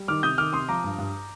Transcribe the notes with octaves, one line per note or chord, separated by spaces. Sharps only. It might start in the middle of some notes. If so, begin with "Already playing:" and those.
Already playing: G3
D#3 D6 F6
C3 D#6 G6
D#3 D6 F6
C3 C6 D#6
F3 A#5 D6
G2
G2